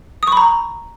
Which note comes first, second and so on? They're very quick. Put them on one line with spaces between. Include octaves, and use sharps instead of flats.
D#6 C#6 B5 A#5